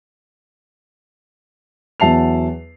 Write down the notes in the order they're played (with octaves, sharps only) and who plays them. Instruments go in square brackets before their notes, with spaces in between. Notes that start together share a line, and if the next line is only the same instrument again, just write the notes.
[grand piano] E2 F#3 E5 A5 C7 F7